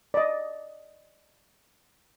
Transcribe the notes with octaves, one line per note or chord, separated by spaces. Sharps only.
D5 D#5